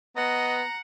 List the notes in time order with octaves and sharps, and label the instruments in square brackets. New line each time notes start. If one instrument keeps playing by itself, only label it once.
[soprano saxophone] B3 [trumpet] D#5 [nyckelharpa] F#5 [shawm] A#5